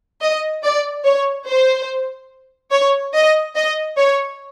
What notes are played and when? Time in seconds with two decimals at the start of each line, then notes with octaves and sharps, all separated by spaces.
0.22 D#5
0.63 D5
1.04 C#5
1.47 C5
2.71 C#5
3.14 D#5
3.55 D#5
3.97 C#5